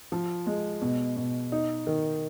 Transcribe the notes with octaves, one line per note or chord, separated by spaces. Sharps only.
F3
G#3
B2
B2
D#4
D#3